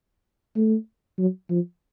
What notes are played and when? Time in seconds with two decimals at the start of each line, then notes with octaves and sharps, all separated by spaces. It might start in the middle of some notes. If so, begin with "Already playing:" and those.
0.56 A3
1.18 F#3
1.50 F3